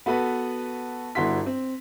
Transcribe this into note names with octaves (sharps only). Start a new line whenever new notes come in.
B3 F#4 A4 B4
G1 E4 F#4 C6 B6
C4